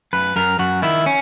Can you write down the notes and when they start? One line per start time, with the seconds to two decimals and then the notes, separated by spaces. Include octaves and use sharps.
0.13 F#2 B4
0.36 F#2 A#4
0.59 F#2 F#4
0.82 D#3 E4
1.06 C#4